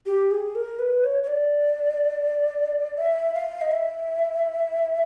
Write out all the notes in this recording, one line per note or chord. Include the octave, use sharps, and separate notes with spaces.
G4
G#4
A#4
B4
C#5
C#5
D5
E5
F5
D#5
E5